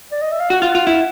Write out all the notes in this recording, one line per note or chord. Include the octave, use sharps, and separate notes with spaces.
D5
D#5
E5
F5
F#4 F#5
F4
F#5
F4
E4